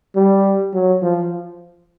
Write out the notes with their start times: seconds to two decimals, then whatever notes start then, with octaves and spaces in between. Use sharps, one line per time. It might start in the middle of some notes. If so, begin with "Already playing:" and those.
0.16 G3
0.74 F#3
1.02 F3